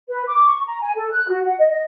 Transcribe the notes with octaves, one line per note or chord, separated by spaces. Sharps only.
B4
D6
C#6
A#5
G#5
A4
F#6
F#4
F#5
D#5
D#5